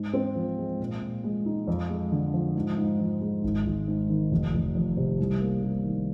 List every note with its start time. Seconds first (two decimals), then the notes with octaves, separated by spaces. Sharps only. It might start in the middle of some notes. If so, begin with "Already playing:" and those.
Already playing: G#2
0.13 C4
0.35 F3
0.58 G#3
0.80 A#2
1.01 A#2
1.24 G#3
1.46 D#4
1.67 F2
1.90 G#3
2.12 D3
2.34 F3
2.56 G#2
2.78 G#2
2.99 F3
3.21 G#3
3.43 G#1
3.65 G#1
3.88 G#2
4.10 D#3
4.31 F1
4.53 F1
4.75 F2
4.97 C3
5.19 C2
5.41 A#3
5.63 C3
5.85 D#3